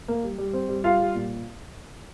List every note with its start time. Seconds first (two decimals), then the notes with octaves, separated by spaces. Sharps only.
0.08 A#3
0.24 G3
0.38 G3
0.53 C4
0.69 G3
0.84 G3 F4 F5
1.00 G3
1.15 A#2